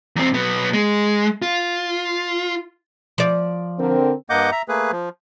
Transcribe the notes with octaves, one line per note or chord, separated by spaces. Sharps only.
E2 C4
B1 B3
G#3
F4
F3 D5
D3 C4 A#4
G2 A#3 D#5 F#5 D6 G6
E5 A#5
A3 A#3 G#4 B4
F3